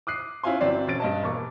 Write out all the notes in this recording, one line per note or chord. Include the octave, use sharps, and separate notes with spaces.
D6 D#6 F#6 C7
C#4 E4 F4 F5 G#5 C6
G1 F#3 C4 D5 C7
E1 C#4 A6 D7
G2 D#5 A5
E1 A#3 C#6 D6